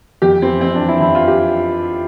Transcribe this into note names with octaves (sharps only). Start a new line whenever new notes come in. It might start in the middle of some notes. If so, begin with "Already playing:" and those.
F2 G4
E3 C4
F2 C4
D4
E3
E4
F2 E4
F4
E3
G4